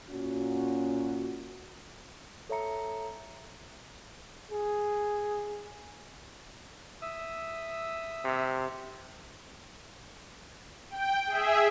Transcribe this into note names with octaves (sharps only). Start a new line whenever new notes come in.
A#2 C#4 F#4
A4 C#5 E5 A#5 C#7
G#4
E5 D#6 E6
C3
G5
G#4 E5